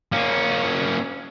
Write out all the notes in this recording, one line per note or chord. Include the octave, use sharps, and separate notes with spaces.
A#3 C#4